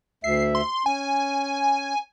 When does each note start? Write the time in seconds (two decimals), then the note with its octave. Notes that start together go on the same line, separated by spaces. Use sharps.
0.24 D2 E5 C7
0.55 C6
0.86 C#4 G#5